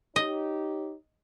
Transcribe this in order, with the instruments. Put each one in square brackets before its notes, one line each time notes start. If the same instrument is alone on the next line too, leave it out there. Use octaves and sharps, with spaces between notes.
[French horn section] D#4 G4 C#5 [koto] D#5